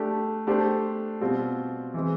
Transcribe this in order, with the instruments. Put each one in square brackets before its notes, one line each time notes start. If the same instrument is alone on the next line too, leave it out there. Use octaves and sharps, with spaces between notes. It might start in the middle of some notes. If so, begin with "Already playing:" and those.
Already playing: [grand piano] A3 D4 G4
A3 D4 G4 C5
B2 G3 C4 F4
E3 G#3 C4